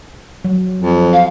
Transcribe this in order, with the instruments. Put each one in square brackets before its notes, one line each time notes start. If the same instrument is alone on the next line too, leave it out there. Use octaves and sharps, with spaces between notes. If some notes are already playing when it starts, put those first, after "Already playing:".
[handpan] F#3
[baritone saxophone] F2
[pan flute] F5